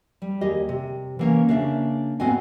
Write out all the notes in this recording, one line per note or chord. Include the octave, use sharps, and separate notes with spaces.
G3
D#2 G4 G#4 D#5
C3
E3 A#3 C#4
C#3 A#3 D4 E5
A2 B3 C4 F#4 D#5 G#5